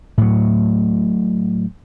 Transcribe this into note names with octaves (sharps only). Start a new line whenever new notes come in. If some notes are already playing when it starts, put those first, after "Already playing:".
A2 F#3